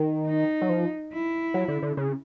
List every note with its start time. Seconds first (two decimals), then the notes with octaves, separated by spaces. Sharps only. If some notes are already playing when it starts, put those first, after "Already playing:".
Already playing: D#3
0.27 D#4
0.62 F#3
0.69 F3
1.13 E4
1.54 F#3
1.68 D3
1.82 D3
1.97 C#3